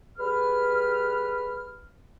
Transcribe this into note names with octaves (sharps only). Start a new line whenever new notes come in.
G3 G#4 B4 B5 F6